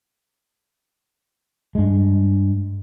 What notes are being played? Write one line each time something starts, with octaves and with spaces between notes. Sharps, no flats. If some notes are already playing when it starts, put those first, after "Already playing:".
G2 G#3